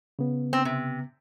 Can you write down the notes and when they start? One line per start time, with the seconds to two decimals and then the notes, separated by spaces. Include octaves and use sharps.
0.19 C#3 B3
0.53 C4
0.65 C3